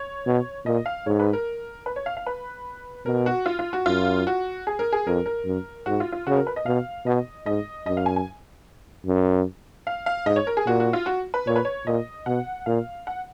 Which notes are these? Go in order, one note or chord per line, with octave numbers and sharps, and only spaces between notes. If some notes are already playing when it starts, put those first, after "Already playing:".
Already playing: C#5
B2
A#2 D#5
F5
G#2 C#5
B4
A#4
B4
C#5
F5
F5
B4
B2 A#4
F#4
F4
F4
F#4
F#2 F4
F#4
G#4
A#4
G#4
F2 A#4
A#4
F#2
G#2 F#4
F4
F4
C#3 F#4
A#4
B4
D#5
B2 F5
B2 D#5
G#2 D#5
F#2 D#5
F5
G#5
G#5
F#2
F5
F5
G#2 D#5
C#5
A#4
G#4
A#2 F#4
F#4
F4
F#4
B4
A#2 C#5
B4
C#5
A#2 D#5
B2 F#5
A#2 F5
F#5